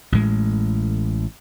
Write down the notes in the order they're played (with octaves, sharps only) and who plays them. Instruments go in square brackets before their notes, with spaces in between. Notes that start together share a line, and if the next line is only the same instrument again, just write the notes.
[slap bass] A1 A2 G#3